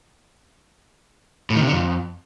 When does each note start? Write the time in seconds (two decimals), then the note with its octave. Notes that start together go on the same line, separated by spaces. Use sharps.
1.50 A2
1.56 D#3
1.61 C3
1.67 D3
1.72 F2